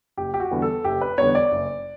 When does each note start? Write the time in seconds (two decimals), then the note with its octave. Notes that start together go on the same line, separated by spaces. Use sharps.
0.17 F#1 G4
0.34 G4
0.40 F#4
0.51 E2 D3 G3 B3
0.62 A4
0.84 F#1 G4
1.01 B4
1.18 E2 D3 G3 B3 C#5
1.35 D5
1.51 F#1